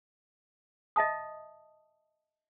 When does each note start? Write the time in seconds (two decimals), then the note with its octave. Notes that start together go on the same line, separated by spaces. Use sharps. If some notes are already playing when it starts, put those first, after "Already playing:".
0.96 D#5 E5 A5 D#6